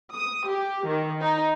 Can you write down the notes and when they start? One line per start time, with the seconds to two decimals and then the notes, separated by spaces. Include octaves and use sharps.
0.12 D#6
0.47 G4
0.85 D#3
1.21 D#4